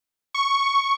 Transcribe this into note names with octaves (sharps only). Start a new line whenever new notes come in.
C#6